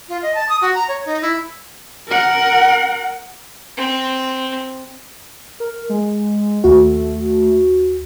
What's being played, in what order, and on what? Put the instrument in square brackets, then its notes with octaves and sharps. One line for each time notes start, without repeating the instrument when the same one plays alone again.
[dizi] F4
D#5
A5
D#6
F#4
A#5
C#5
D#4
E4
[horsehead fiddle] A#4 F#5
[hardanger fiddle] C4
[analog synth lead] A#4
G#3
[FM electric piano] D#2 F#4 [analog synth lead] A3